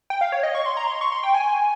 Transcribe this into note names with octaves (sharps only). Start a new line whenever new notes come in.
G5
F5
C#5
D#5
C#6
C6
A#5
C6
C#6
C6
G5
G#5